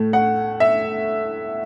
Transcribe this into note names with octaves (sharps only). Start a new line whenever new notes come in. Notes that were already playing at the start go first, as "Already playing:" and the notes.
Already playing: A2 A3
F#5
E5